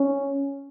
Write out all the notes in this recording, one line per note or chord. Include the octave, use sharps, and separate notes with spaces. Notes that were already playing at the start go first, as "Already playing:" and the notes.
Already playing: C#4